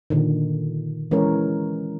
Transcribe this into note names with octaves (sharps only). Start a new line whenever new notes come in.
A#2 D3 D#3
E3 G#3 C#4 A#4 C#5